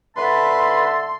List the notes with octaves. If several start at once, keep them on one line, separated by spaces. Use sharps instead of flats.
D3 B4 E5 A5 C6